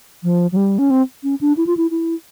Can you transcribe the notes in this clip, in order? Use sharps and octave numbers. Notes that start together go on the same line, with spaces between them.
F3
F#3
G3
C#4
C4
C#4
D4
E4
F4
E4
E4